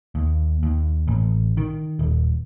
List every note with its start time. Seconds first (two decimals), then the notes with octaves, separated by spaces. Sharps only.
0.15 D#2
0.63 D#2
1.08 A1
1.57 D#3
1.99 D#1